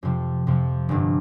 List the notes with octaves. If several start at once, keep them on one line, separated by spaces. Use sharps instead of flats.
F2 C3 F3
F2 C3 F3
G1 G2 D3 F3 D4